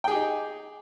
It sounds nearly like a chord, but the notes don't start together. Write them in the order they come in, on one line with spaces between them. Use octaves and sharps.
G5 G#4 G4 D#4